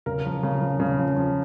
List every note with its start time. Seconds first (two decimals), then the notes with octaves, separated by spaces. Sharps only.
0.06 C#3 A#4
0.25 F3
0.43 C#3
0.61 F3
0.80 C#3
0.99 F3
1.16 F3